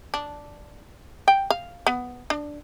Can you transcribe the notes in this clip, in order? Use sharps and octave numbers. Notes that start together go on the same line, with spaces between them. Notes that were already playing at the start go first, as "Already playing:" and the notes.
D4
G5
F5
B3
D4